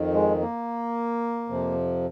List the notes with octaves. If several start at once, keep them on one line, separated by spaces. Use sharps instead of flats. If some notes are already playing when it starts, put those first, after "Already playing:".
Already playing: F2 D#3
G#3
A#3
F2 C3 F3